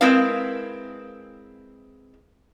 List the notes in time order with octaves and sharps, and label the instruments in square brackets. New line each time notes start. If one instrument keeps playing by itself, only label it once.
[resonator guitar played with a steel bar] G#3 C4 E4 A#4 B4 F5